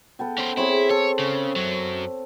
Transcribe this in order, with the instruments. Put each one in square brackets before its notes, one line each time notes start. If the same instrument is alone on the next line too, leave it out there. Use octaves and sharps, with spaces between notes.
[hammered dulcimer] B3 A4 G5
[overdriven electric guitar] C#4 C5
[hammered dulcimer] C4 G#4 C#5 [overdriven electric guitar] E4
[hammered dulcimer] A4 [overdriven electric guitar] C#5
[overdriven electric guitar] C#3
F#2 F#3